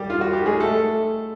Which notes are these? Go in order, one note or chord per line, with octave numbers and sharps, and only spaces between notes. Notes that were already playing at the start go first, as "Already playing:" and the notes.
Already playing: G3 G4
F4
F#4
G4
G#3 G#4
A3 A4